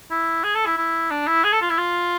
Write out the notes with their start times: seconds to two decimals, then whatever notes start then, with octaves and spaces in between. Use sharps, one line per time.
0.11 E4
0.43 G#4
0.55 A4
0.66 E4
0.77 E4
1.11 D4
1.27 E4
1.44 G#4
1.53 A4
1.61 F4
1.70 E4
1.78 F4